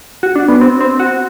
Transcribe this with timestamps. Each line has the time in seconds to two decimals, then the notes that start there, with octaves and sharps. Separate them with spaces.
0.23 F#4
0.35 D4
0.48 B3
0.61 C4
0.81 C4
1.00 F#4